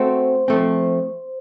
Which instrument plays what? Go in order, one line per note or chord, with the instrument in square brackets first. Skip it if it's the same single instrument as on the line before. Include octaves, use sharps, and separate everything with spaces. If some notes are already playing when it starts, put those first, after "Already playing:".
Already playing: [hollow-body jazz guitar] A3 C4 F#4 [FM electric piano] C5
[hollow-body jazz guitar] F3 A3 C4